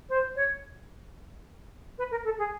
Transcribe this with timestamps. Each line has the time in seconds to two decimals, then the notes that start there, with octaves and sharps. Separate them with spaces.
0.09 C5
0.35 C#5
1.98 B4
2.10 A#4
2.24 A4
2.38 G#4